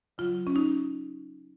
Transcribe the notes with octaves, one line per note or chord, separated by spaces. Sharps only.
C#3 F#3 F4
C#4
D#4